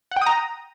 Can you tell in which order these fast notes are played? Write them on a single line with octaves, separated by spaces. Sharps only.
F#5 G5 D#6 A#5